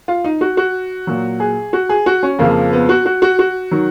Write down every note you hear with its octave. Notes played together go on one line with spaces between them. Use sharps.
F4
D#4
F#4
F#4
A#2 F#3
G#4
F#4
G#4
F#4
C#4
F2 C#3 F3 A#3
B3
F#4
F#4
F#4
F#4
D#3 F#3